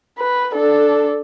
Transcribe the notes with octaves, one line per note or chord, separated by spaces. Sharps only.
B4
D4 A4